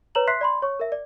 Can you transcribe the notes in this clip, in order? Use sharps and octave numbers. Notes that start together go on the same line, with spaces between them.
B4 C#5 A#5 E7 F#7
E5 C6 F#6 B6 C7
D5 B5 C6
C#5 C#6
A#4 E5
D5